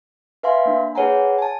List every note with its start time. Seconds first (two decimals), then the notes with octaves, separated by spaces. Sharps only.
0.43 B4 E5 F5 G#5 C6
0.66 A#3 D4
0.95 G#4 B4 C#5 F#5 G#5 A#5
1.38 G#5 A5